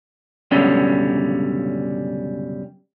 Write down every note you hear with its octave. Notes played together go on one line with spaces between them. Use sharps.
C#2 F#2 B2 D3 G3 C#4